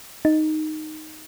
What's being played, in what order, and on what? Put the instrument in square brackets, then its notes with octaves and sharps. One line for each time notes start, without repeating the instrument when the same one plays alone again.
[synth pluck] D#4